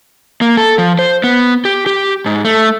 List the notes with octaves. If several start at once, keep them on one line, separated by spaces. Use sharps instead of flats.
A#3
A4
F3
C5
B3
G4
G4
G#2
A3